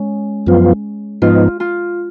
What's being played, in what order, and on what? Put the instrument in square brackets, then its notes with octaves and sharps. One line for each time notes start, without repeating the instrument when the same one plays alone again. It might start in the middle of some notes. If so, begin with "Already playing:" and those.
Already playing: [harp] G#3 C#4
[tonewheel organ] F#2 F3 B3 F4
[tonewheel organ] G#2 F3 B3 D#4 [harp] F4
[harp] F4